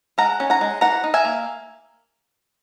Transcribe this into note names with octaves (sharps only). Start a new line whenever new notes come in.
G#3 F#5 A#5
C#4
F#5 A#5
G#3
E3 F#5 A#5
D#4
E5 G#5
A#3